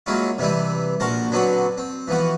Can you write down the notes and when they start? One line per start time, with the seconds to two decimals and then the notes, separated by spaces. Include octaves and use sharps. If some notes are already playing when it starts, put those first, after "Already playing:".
0.06 F#3 G#3 A#3 C#4 E4 F4
0.38 C3 E3 G3 C4 E4
1.00 A#1 F#4 A#4 C5 A5
1.31 D3 F#3 B3 C4 D4 F#4
1.78 C4
2.08 E3 F3 B3 F#4